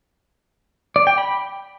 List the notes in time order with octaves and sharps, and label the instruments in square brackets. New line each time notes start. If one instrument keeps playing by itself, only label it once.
[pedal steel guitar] D5
G5
B5